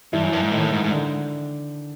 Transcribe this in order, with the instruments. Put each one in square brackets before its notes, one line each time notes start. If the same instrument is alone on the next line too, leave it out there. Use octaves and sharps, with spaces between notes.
[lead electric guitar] G2 [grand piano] E3 E4
[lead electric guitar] F#2
G2
G#2
[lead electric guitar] A2 [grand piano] D#3 D#4
[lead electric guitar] G#2
G#2
[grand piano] D3 D4